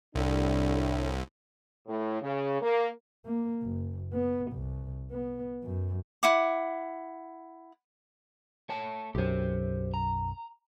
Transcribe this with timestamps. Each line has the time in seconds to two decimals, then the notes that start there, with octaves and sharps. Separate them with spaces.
0.15 C2 A2 D4
1.87 A2
2.21 C#3
2.61 A#3
3.25 A#3
3.62 F#1
4.13 B3
4.52 C2
5.11 B3
5.63 F#2
6.23 E4 F#5 D6
8.69 A3 C#5 A5
9.15 B1 F#2 G4 C5
9.94 A#5